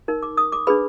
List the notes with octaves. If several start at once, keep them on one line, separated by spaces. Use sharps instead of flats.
D#4 A#4
D6
D#6
D6
D4 G#4 B4 B5